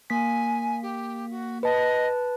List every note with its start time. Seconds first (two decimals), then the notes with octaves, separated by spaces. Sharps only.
0.10 A#3 G#5 B6
0.82 G4
1.30 F#4
1.63 B4 D#5 A5